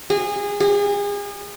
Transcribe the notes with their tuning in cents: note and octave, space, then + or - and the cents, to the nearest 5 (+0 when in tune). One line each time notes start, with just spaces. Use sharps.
G#4 -25
G#4 -35